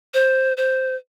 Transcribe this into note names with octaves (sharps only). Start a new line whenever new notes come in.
C5
C5